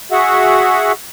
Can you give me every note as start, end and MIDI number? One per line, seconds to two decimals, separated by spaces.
0.11 0.92 66
0.11 0.92 68
0.11 0.92 76
0.11 0.92 78